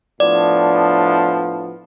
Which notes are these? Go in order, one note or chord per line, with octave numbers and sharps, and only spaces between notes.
A2 F3 B3 D4 D5